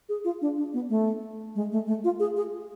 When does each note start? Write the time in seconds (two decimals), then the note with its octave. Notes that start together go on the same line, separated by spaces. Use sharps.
0.09 G#4
0.25 F4
0.42 D4
0.58 D4
0.74 B3
0.90 A3
1.55 G#3
1.72 A3
1.87 A3
2.04 F4
2.20 G#4
2.36 G#4